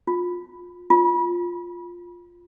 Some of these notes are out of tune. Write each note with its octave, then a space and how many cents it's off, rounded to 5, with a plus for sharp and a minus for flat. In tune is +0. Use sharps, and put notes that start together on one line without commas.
F4 +25
F4 +5